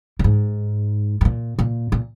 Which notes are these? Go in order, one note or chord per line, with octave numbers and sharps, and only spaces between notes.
A#2
G#2
G#2
A#2
A#2
A#2